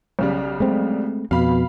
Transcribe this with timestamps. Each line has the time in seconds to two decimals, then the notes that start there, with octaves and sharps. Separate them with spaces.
0.19 B1 C#3 G3
0.60 G#3 A3 C4
1.31 F2 B2 F5 B5